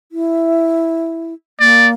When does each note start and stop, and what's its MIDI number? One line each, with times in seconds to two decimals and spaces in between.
0.12 1.34 64
1.60 1.94 58
1.60 1.88 74